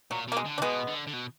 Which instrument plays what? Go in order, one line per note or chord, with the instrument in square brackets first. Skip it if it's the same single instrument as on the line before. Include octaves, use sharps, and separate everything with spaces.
[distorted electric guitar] A#2 [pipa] F#3
[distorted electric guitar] B2 [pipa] A#3
[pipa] G#3
[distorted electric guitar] D3
[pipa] D4
[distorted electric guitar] B2 [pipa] G#3 B3
[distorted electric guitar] D3
D3
B2